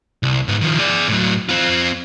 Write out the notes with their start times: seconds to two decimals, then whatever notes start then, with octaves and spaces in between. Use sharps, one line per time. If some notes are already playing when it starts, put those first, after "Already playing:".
0.23 C2
0.48 G#2 B3
0.61 D#3 F3
0.79 G#4 D5
1.08 A2 F#3
1.49 C4 F4